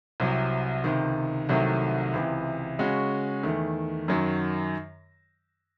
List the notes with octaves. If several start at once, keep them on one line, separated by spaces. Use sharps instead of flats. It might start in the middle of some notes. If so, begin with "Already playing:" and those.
C2 C3 F#3
C#2 C3 D#3
C2 C3 D#3 F#3 A3
C#2 C3 E3
C#3 G#3 C#4 F#4
E2 D#3 A3
F#2 D#3 F#3